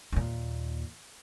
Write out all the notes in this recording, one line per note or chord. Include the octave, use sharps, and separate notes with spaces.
D#2 A#2